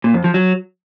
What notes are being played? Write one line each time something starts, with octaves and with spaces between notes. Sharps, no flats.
A#2
F2
F3
F#3